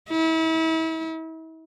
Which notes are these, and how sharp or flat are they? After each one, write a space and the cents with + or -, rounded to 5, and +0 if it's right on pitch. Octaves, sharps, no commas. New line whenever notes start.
E4 -35